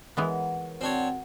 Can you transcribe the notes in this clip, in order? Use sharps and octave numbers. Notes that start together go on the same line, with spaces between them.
E3 G#3 B3 A#4 C#5 F#5
C4 D4 F#4 C#5